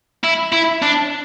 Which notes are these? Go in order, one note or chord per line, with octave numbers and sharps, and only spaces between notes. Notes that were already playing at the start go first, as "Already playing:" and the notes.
E4
E4
D4